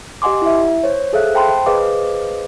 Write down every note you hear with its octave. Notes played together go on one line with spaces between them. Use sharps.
G4 D#5 F#5 G#5 C6 D6
E4 E5
C5 C#5
G#4 A4 C5 E5 F5 F#6
C5 G5 A5 B5 C6
G#4 B4 C5 D#5 F5 D6